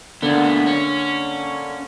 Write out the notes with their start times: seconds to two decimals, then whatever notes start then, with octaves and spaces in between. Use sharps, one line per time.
0.22 D2 D3 A#3 B3
0.66 C#4